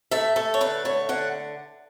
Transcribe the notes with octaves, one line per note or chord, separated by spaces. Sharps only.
A3 E5
A3 A4
C#5
D3 B4
A3 C#5
D3 F#5